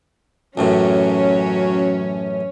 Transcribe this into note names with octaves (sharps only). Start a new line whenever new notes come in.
A1 F#2 A2 F#3 C#4